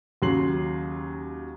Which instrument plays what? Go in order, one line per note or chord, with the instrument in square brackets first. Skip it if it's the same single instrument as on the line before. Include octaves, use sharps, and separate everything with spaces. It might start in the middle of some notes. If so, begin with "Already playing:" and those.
[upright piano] D#2 C#3 F#3 C6 C7 F#7